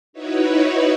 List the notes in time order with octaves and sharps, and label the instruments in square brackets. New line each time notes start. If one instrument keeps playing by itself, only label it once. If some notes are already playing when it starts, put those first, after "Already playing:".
[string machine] D#4 E4 F#4 B4 C#5